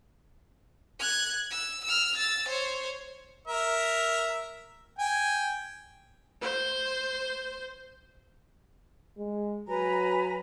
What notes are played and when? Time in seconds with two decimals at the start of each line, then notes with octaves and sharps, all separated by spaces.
0.99 F#6 G#6
1.50 E6
1.84 E6 F6
2.16 E6 A6
2.48 C5 C#5
3.47 A#4 E5
4.99 G5 G#5
6.41 C5
9.18 G#3
9.68 F#3 B4 G#5 A#5